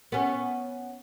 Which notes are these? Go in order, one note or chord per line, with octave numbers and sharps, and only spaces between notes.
B3 C#4